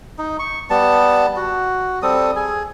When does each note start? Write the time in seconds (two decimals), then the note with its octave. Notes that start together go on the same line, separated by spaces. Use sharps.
0.18 D#4
0.39 C#6
0.70 G3 B3 A5
1.36 F#4
2.02 G3 C4 A4 D#6
2.36 G#4 G#5